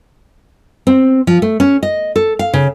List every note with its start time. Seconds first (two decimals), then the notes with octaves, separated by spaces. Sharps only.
0.87 C4
1.27 F3
1.42 A3
1.60 C#4
1.83 D#5
2.16 A4
2.39 F5
2.54 C#3